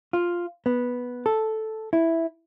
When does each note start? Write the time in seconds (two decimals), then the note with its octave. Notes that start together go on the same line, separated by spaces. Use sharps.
0.13 F4
0.66 B3
1.26 A4
1.93 E4